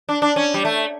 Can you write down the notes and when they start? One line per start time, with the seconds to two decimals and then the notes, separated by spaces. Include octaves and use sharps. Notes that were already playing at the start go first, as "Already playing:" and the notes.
0.09 D4
0.22 D4
0.36 C#4
0.54 G3
0.65 A3